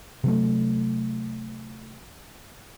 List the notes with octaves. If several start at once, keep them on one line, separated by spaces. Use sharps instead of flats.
C3 F#3 A3